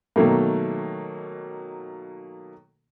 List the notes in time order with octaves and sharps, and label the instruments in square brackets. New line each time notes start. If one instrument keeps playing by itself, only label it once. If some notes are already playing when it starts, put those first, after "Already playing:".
[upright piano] B2 D#3 F#3 A3 A#3